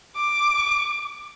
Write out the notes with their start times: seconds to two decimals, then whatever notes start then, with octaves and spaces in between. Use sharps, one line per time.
0.16 D6